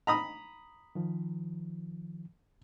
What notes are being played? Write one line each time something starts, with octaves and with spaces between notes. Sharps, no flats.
A#5 B5 D#6
D#3 F3